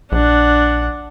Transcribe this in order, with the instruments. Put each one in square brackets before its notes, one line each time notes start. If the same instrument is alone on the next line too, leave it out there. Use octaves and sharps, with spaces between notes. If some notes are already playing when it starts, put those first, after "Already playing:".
[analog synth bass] A#1 [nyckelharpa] D4 F#5